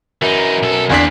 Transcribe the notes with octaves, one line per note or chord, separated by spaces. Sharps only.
F#2 E3 D#4
B1 A4
E2 A#3 C4 D4 B6